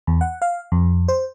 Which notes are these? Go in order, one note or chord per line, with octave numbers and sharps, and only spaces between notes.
E2
F#5
F5
F2
C5